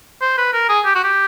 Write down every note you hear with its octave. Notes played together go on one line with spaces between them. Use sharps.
C5
B4
A#4
G#4
G4
F#4
G4